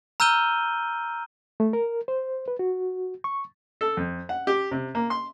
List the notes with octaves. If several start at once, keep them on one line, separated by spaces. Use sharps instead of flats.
A#5 E6 F6 G6 D#7 G7
A3
A#4
C5
B4
F#4
C#6
A4
F2
F#5
G4
C3
A#3
C6